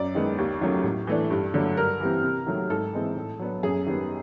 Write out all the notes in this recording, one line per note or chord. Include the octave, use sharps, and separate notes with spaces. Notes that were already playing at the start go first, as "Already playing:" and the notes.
Already playing: F#2 D5
D#3 G#3 B3
D#2
D#3 F#3 A3 C#4
A2
E3 A3 D4
G2
D3 F#3 A3 D4
G2 A#4
E3 G3 C4
C3
D#3 F#3 A3
G#2 A4
E3 G#3 C4
A2
F#3 B3 D4
F#2 G#4
D#3 G3 B3